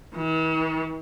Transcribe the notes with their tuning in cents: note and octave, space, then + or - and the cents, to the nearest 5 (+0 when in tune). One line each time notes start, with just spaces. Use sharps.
E3 -45